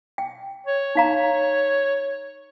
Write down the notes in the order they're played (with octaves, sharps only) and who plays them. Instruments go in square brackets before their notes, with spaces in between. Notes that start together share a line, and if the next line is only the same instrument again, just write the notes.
[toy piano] G5
[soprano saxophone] C#5
[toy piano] D#4 F5 A#5